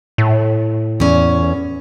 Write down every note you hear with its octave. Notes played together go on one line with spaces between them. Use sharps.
A2
E2 C#4